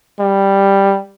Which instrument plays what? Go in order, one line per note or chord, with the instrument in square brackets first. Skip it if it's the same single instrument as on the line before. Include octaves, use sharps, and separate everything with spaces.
[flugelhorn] G3